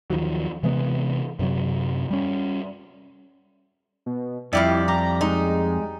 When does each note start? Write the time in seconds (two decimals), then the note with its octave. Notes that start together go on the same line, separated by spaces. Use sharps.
0.10 D#2 D#3 F3 F#3
0.63 C3 E3 G#3 B3
1.39 F#2 C3 F#3
2.10 G3 C#4
4.06 B2
4.53 F2 G3 E4 G4 F5
4.88 G4 A#5
5.21 G#3 D#4